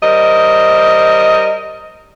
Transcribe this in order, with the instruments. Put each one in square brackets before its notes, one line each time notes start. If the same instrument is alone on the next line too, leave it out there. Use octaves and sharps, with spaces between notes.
[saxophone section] G3 A#4 C5 D#5